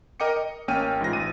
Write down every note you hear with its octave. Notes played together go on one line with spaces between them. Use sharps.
A#4 D#5 G5 D6 C#7
D#5
A1 A#3 C#4 G5 F6 D#7
G#2 E3 F4 A#6
A1 D#7